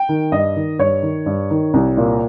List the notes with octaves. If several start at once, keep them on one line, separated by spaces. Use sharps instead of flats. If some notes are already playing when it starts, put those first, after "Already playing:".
Already playing: G5
D#3
G2 D#5
D#3
G2 C#5
D#3
G2
D#3
C2
A#2